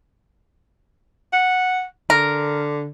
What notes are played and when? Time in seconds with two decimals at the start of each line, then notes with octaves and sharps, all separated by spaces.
1.33 F#5
2.10 D3 A#4